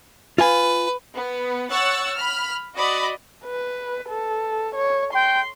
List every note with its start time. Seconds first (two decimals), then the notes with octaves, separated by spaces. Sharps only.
0.38 F4 B4 F5 G#5
1.14 B3
1.70 C#5 F#5 C#6 E6 F#6 A6
2.15 B5 F6
2.77 F#4 D5 D#5 B5
3.45 B4
4.09 A4
4.76 C#5
5.14 G5 C6